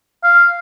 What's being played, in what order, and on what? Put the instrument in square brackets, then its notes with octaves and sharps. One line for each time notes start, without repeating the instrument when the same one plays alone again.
[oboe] F5